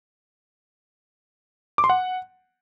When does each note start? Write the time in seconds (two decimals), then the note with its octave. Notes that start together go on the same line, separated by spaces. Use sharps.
1.78 D6
1.84 C6
1.90 F#5